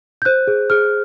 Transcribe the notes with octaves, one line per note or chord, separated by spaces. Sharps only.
G6
C5 F#6
G#4
G#4 F6